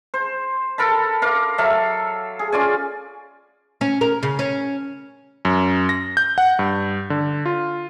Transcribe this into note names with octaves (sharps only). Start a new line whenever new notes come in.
C5
A4 A#4 A5 B5
A#4 F5 D6
F#3 A4 E5 F5
G#4
C#4 F4 D5 G#5
C#4
A#4
C#3
C#4
F#2
A#6
G6
F#5
G2
D3
F4